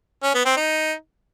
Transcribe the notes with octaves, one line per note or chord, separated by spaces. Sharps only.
C#4
B3
C4
D#4